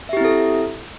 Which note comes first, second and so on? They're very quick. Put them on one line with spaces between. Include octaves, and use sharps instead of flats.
E5 G4 E4 C4 A4